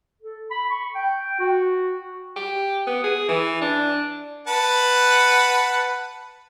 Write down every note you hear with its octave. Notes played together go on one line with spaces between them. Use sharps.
A4
B5
C#6
G5
F#4
G4
B3
G#4
E3
D4
B4 F#5 A5